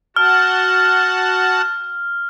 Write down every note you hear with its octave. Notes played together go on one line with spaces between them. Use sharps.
F#4 F#5 A5 F6